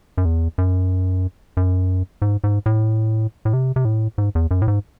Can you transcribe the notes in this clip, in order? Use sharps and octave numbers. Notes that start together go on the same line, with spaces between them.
F#2
E2
F#2
F#2
G#2
G#2
A2
A2
C3
C3
A2
G#2
E2
F#2
A2
G#2